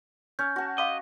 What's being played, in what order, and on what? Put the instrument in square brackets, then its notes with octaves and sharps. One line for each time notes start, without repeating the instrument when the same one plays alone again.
[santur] C#4 [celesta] F6 G6
[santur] F#4 A5
[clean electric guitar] D#5 [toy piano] F5 C6 D6